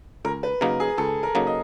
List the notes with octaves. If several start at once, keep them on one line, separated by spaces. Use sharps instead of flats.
C#2 A#4
B4
C#3 F#3 A#3 D#4 A#4
G#4
C#2 A4
A#4
C#3 F#3 A#3 D#4
D#5